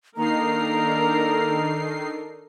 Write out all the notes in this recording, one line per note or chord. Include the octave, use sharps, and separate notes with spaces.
D#3 A#3 D4 D#4 A4 A#4 A#5 C7